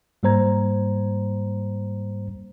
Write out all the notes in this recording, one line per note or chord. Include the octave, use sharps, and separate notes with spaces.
G#2 G3 A#3 C5 A#5 G#6